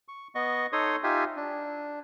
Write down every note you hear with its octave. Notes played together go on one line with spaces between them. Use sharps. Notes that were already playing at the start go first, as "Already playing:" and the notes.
C#6
B3 D#5 C#6
D#4 A4 C#5 C6 D#6
D#4 F4 G4 E5 G#5
D4